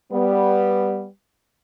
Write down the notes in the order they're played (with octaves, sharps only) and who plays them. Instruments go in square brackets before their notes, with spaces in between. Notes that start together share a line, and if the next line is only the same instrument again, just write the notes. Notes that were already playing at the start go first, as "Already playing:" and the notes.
[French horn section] G3 B3